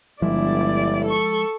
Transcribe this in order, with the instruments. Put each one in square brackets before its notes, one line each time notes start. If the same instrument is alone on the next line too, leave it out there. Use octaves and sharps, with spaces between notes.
[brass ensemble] G1 [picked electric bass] F3 G#3 [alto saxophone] E4 [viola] D5
[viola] A4 C#6